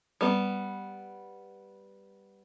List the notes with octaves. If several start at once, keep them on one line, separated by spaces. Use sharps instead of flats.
G3 B3